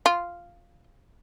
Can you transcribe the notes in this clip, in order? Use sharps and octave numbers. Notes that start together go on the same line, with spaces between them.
F4